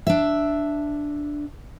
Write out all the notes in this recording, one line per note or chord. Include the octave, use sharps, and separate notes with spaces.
D4 E5